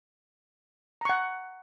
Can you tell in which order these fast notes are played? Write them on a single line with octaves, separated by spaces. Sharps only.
A#5 C#6 F#5